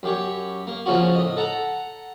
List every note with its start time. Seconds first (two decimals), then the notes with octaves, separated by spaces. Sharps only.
0.03 F#2 G4 C#5
0.67 A#3
0.86 C#3 F3 A#3 C#4 F4 F#4
1.15 A2 D#5
1.37 A4 F#5 A#5